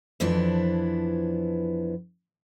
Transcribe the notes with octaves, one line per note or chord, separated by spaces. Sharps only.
F2 E3 F3 B3 D4 E4